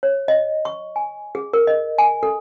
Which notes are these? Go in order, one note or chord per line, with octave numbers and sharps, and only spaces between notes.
C#5
D#5
C#6
G#5
G#4
A#4
D#5
G#5
A4